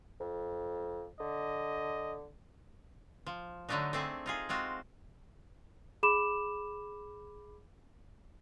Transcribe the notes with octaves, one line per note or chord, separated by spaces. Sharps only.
F2
D3 D#5
F3
D3 F#3 A3 D4 D#4
A3 C4 G#4
D#4 F4 G#4
G#3 C4 F4 F#4
G#4 B5 D6 E7